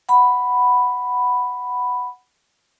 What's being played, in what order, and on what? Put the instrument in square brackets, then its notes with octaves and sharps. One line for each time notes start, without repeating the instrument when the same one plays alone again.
[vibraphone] F#5 B5